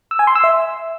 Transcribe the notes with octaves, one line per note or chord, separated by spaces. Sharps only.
E6
G#5
C6
E6
E5